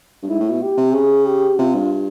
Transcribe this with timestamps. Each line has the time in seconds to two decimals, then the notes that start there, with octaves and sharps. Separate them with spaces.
0.23 G2
0.29 G#2 E4
0.40 A2
0.50 B2
0.62 G4
0.77 C3
0.94 C#3 G#4
1.27 G4
1.59 C3 F4
1.74 G2